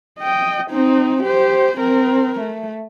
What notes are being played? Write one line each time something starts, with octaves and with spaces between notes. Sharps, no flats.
D#5 G5
C4 D#4
G4 C5
C4 A#4
A3